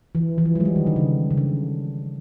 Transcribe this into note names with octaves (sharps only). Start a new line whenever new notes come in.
E3
E3
F3
F#3
G#3
G3
D#3
D3
C#3
C#3
D3